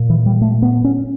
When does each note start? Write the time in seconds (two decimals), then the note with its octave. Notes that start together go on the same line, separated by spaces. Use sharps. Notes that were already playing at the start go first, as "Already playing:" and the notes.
Already playing: A#2
0.10 E3
0.26 G3
0.41 A3
0.62 B3
0.84 C#4